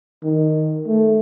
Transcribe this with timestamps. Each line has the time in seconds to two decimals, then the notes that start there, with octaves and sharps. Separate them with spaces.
0.23 D#3
0.87 A3